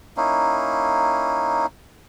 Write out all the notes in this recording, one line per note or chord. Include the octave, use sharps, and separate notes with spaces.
A#3 C#4 D#4 E4